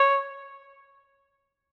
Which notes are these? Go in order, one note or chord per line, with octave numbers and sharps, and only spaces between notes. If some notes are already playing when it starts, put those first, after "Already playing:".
Already playing: C#5